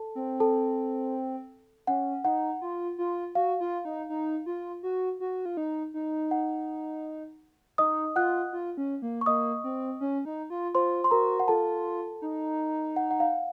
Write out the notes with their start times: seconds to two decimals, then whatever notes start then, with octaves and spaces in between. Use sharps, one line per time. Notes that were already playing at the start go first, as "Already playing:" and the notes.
Already playing: A4 A5
0.15 C4
0.40 A4 A5
1.87 C#4 F#5
2.24 D#4 F#5
2.62 F4
2.98 F4
3.35 F#4 F5
3.60 F4
3.85 D#4
4.09 D#4
4.46 F4
4.83 F#4
5.20 F#4
5.46 F4
5.57 D#4
5.94 D#4
6.31 F#5
7.78 D#4 D#5 D#6
8.16 F4 F#5 F#6
8.53 F4
8.77 C#4
9.02 A#3
9.21 C#6
9.26 A#3 D#5 D#6
9.64 C4
10.01 C#4
10.25 D#4
10.50 F4
10.74 F4 C5 C6
11.04 C6
11.11 F#4 A#4 A#5
11.40 F#5
11.48 F4 A4 A5
12.22 D#4
12.96 F#5
13.11 F#5
13.20 F5